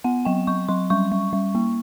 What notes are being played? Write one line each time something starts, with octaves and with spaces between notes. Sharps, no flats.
B3 F#5
F#3 G5
F#3 C#6
F#3 C6
G3 C#6
G3
G3
A#3